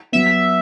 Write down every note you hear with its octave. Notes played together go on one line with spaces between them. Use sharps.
F#3 B3 E5